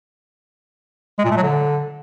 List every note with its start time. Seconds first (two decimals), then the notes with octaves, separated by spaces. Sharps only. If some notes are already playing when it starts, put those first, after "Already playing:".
1.19 G#3
1.25 A#2
1.31 A3
1.37 F#3
1.43 D3